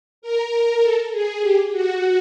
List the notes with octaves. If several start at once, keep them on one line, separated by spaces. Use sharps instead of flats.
A#4
A4
G#4
G4
F#4